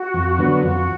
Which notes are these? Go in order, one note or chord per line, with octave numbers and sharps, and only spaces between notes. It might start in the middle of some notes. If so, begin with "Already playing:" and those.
Already playing: F#4
F2
D3 F#3 B3
F2 F#4